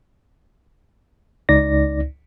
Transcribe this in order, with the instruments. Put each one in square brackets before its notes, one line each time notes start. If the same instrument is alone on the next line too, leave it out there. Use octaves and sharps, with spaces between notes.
[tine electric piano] C#2 D#4 D5 A#6